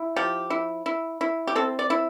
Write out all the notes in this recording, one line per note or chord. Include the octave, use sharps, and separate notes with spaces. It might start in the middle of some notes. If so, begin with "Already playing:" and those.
Already playing: E4
F3 G4
E4
E4
E4
G4
C4 A4
D5
E4